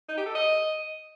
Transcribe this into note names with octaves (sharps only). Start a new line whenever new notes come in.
D#4
G4
A4
D#5